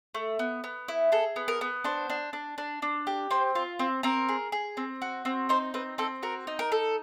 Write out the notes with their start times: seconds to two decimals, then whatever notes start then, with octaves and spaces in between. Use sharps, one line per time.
0.15 A3
0.39 B3
0.64 B3
0.88 E4
1.12 G#4 A4
1.36 B3
1.48 A#4
1.61 B3
1.84 D4 C5
2.10 D4
2.33 D4
2.58 D4
2.82 D4
3.07 G4
3.31 C4 C5
3.55 F4
3.79 C4
4.03 C4 A#4
4.29 G#4
4.52 G#4
4.77 C4
5.02 F#4
5.25 C4
5.49 D#4 C5
5.74 C4 B4
5.98 C4 A4
6.23 F#4 A#4
6.47 D#4
6.59 A#4
6.72 A4